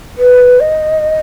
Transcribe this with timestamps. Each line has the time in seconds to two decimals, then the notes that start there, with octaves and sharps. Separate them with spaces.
0.18 B4
0.60 D#5